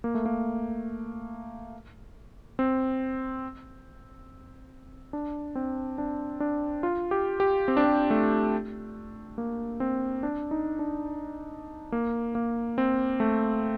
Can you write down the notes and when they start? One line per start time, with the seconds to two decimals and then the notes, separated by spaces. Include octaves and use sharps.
0.04 A#3
0.15 A3
0.26 A#3
2.59 C4
5.13 D4
5.55 C4
5.98 D4
6.40 D4
6.83 F4
7.11 G4
7.40 G4
7.68 C4
7.77 D4
7.84 C4
8.10 A3
9.38 A#3
9.80 C4
10.23 D4
10.51 D#4
10.79 D4
11.92 A#3
12.35 A#3
12.78 C4
13.20 A3